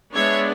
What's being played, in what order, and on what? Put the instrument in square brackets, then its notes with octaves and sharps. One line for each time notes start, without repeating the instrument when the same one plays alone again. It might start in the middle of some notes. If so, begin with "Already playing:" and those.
[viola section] G#3 B3 D4 C#5 E5